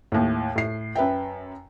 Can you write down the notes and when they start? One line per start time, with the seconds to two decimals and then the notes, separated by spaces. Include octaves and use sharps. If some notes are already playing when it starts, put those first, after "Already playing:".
0.12 D#2 A2
0.56 A2 C7
0.95 F#2 B4 E5 G5